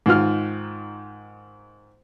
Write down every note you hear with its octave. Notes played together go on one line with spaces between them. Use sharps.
G#2 D#3 F4 F6